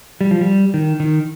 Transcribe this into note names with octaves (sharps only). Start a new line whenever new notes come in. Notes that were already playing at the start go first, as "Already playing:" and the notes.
G3
F3
G3
D#3
D#3